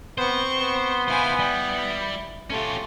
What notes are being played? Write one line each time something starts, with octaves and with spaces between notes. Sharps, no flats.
B3 C4 C5 C#6
B3
E4 C5 F5 G#5
G3 E4
A3 C#4 F4 G4